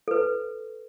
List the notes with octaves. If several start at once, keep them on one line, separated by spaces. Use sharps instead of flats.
A4 B4